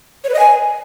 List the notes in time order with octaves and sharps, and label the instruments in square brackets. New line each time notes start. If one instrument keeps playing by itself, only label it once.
[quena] C#5
B4
D#5
G#5